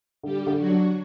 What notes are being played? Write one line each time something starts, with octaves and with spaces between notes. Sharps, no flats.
D3 G3 G4
D3
F#3 F#4
D4